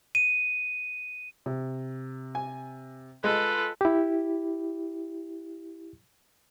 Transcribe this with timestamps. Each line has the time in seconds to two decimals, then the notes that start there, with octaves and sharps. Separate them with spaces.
0.15 D#7
1.46 C3
2.35 G#5
3.24 G#3 F4 A4 B4
3.81 E4 G4